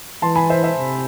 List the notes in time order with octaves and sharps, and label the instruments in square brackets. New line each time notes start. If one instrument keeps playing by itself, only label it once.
[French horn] E3 [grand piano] A5 C6
[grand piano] G#5 B5
C5 E5
C5 E5
[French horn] C3